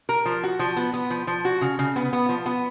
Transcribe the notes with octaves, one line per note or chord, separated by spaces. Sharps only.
A#4
F3
F#4
F3
B3
B3
F3
F3
F#4
C#3
C#3
B3
B3
F3
B3